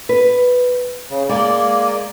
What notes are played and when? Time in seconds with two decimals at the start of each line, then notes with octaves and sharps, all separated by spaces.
0.09 B4
1.10 C#3
1.29 G#3 A#3 D5